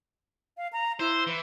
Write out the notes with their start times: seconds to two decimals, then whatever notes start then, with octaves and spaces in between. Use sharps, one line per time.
0.57 F5
0.73 A#5
1.00 E4 C5
1.27 E3